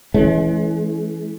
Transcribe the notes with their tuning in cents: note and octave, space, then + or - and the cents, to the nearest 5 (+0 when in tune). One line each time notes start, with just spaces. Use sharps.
E3 +0 G#3 +40 C#4 +0